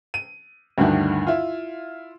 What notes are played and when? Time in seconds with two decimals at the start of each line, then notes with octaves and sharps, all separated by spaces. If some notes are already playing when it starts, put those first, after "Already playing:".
0.14 D#7
0.78 D2 G2 D3 D#3 D4 E4
1.27 E4 F4